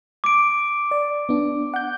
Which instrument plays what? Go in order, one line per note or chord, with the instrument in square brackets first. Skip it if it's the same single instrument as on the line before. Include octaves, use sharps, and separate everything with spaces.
[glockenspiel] D6 D7
[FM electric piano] D5
B3 D4
F#5 G6